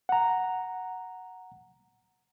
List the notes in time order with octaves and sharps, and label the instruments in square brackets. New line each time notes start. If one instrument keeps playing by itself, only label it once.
[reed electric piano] F#5 A#5